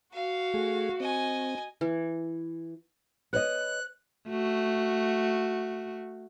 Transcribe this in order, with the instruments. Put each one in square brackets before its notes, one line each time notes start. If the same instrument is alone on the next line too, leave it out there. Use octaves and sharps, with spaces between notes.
[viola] F#4 [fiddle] F5
[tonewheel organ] A3 G#4
[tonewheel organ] C4 [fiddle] D#5 G#5
[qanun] E3
[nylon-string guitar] B4 C#5 D#5 [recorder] F#6
[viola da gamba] A3 F#4